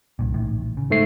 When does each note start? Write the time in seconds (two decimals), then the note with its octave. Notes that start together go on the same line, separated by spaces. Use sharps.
0.19 C2 G2 A#2
0.33 A1 A2 D#3
0.77 C#3
0.90 G#2 A3 C7